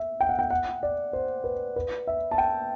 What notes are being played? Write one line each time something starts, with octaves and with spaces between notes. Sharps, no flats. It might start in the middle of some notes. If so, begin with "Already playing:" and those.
Already playing: E5
G5
F#5
G5
F#5
D5
C5
B4
B4
E5
A5
G5